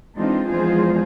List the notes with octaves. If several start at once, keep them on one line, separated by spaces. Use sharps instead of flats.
E3 G#3 C4 D4 D#4 F4
E2 F3 G#3 F4 G#4 C5